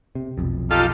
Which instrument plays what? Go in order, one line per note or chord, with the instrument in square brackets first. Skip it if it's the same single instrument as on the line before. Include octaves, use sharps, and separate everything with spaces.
[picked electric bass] C3
F1 B1 F2
[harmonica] D#4 G4 F6 [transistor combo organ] F4 A4